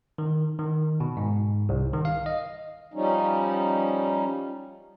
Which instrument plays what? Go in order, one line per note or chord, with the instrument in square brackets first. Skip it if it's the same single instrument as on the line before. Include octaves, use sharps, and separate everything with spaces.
[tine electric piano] D#3
D#3
B2
G#2
C2
D#3
F5
D#5
[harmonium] F3 G3 C#4 D#4